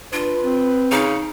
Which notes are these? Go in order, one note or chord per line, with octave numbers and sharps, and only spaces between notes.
D4 F4 B4
C4
C#3 D#4